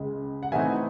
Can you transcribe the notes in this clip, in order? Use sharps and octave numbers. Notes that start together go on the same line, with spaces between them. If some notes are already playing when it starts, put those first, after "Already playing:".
Already playing: C#2 C#3 G#3
F#5
A2 E3 A3 C4 D#4 E5 G#5